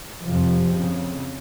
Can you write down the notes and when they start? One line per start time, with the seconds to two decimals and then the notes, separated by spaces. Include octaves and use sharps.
0.22 F2 C3 F3
0.68 F2 C#3